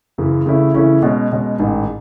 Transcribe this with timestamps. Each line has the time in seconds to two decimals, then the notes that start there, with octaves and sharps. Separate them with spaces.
0.18 F#2 C#3 E3
0.46 C#3 E3 A3 C#4 E4
0.74 C#3 E3 A3 C#4 E4
1.02 B2 G#3 C#4
1.32 B2 G#3 C#4
1.59 A1 G#2 D#3